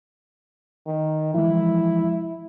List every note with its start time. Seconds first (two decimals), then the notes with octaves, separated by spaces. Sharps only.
0.86 D#3
1.34 E3 F3 G#3 E4